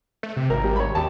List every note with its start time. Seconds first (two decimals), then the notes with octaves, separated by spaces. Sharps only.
0.23 A3
0.37 C3
0.50 G#1 A#4
0.64 G3
0.76 C#5 B5
0.95 D#2 G4 A5